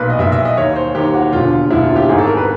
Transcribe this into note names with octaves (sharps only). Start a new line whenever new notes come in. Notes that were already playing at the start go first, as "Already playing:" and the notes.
Already playing: B1 A#2 B4
D#5
B1 A#2 E5
E5
D#5
D#2 D#3 C#5
C5
D#2 D#3 G4
F#4
E1 D#2 D3 F4
E1 D#2 D3 E4
F4
G4
G#1 G#2 D#3 G#4
A4
A#4
B4